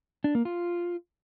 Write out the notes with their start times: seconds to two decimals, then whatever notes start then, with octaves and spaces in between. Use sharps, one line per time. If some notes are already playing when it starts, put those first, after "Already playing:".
0.24 D4
0.35 A#3
0.45 F4